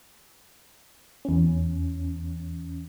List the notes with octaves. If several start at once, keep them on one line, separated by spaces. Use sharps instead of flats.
E2 C#4